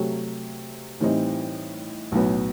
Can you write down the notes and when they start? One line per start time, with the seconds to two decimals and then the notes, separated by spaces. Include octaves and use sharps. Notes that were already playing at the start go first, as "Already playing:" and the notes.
Already playing: C3 F#3 A3
1.00 A2 E3 G3 C4 D#4
2.12 B1 A2 F#3 B3